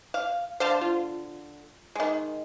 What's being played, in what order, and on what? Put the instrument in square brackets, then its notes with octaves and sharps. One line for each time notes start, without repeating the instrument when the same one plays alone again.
[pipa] F5
[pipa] D3 [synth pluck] C5 F5 A5
[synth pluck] F4
[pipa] D#3 G#3